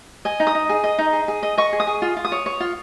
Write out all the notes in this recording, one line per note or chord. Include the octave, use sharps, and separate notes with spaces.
D#5 G#5
D#4
D#6
D#4
G#4
D#5
D#4
G#4
G#4
D#5
D#5 C#6
G#4
D#6
G#4
F4
F4
D#6
C#5
C#5
F4